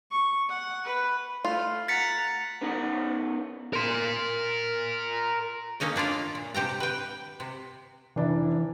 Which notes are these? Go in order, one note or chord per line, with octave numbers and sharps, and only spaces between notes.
C#6
F#5
B4
A3 F4
F#5 A#5 A6 B6 C#7
B3 C#4 D#4 A#4 F#5
A#4 C6
A3 A#3 C#4 D#4 D#5
A#3 D4 F4 F5
A#2
C3 G4 G5 A#5
B4 G5
C3
F1 E3 D4 E4